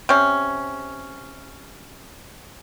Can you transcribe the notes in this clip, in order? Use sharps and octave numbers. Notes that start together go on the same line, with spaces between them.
C3 C#4